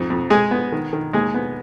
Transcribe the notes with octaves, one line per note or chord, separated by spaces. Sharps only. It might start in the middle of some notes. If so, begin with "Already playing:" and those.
Already playing: F2 G#2
F2
G#3 G#4
B3
D#3
D#3
D#2 G#3 G#4
B3